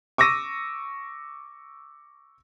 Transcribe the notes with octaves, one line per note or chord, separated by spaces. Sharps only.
C#6 D6 E6 A#6 D#7